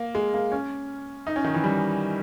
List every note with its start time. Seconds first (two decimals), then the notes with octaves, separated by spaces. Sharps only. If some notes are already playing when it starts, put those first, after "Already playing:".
Already playing: A#3
0.15 G#3
0.34 A#3
0.52 C#4
1.27 D#4
1.36 C#4
1.44 D#3
1.54 E3
1.64 G3